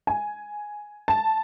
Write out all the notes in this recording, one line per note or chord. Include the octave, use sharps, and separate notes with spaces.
G#5
A5